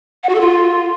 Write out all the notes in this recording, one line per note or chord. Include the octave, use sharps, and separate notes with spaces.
F#5
F#4
A4
F4